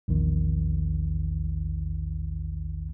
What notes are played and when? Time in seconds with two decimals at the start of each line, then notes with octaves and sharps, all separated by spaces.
0.08 A#1 E2 D#3